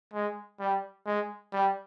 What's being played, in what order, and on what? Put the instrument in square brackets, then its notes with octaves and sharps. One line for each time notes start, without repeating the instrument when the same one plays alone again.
[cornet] G#3
G3
G#3
G3